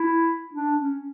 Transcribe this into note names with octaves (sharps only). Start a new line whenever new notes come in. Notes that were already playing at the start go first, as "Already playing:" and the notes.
Already playing: E4
D4
C#4